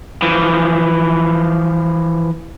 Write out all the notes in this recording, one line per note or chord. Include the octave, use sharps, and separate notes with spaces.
E3 F3